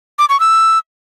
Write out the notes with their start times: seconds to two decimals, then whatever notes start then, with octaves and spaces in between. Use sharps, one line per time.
0.19 D6
0.29 C#6
0.40 E6